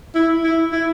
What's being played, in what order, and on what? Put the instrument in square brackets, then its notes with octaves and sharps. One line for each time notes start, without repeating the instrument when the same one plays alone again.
[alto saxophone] E4
E4
E4